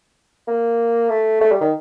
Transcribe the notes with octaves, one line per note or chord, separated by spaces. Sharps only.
A#3
A3
A3
G3
D#3